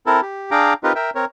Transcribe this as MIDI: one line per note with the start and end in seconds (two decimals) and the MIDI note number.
0.06 0.21 60
0.06 0.21 64
0.06 0.21 69
0.06 0.21 70
0.22 0.51 67
0.51 0.73 62
0.51 0.73 68
0.51 0.73 77
0.51 0.73 79
0.51 0.73 82
0.51 0.73 86
0.84 0.93 60
0.84 0.93 63
0.84 0.93 65
0.84 0.93 67
0.84 0.93 70
0.84 0.93 71
0.96 1.10 70
0.96 1.10 76
0.96 1.10 79
1.15 1.25 60
1.15 1.25 70
1.15 1.25 73